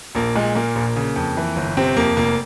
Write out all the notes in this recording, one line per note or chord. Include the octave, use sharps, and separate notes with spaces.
A#1 A#3
A#2 G#3
A#2 A#3
A#1 A#3
C#3
F2
E3
G1
C3 C4
F2 A#3
F1 A#3